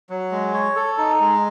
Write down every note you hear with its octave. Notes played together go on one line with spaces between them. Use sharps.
F#3
G#3
C#5
A4
D#4
G#3